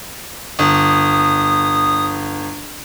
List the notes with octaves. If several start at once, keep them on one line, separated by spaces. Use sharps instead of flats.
G1 D#6